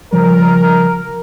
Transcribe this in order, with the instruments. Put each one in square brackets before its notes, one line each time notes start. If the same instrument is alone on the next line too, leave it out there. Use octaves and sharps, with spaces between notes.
[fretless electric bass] C#3 F3 G3 [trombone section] A#4